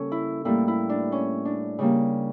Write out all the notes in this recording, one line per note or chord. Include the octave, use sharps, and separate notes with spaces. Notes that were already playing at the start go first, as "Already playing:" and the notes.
Already playing: C#3 G3 A#3 C#4 A4
E4
A2 G3 A#3 E4
E4
D4
C#4
D4
C#3 G3 A#3